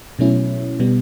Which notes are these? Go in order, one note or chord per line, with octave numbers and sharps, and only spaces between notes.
B2 F#3 A3 C#4 E4
B2 G3 B3